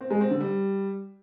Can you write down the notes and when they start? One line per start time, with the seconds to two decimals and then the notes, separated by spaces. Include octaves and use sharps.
0.01 C4
0.11 G#3
0.21 C4
0.31 D3
0.41 G3